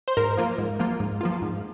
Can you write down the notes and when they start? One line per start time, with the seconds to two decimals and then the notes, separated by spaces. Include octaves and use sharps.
0.08 C5
0.17 G#2 A#4
0.38 F3 A#3 F4
0.58 G#2
0.79 F3 A#3 F4
1.00 G#2
1.21 F3 A#3 F4
1.42 G#2